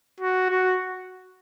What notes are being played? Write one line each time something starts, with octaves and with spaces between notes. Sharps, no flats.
F#4
F#4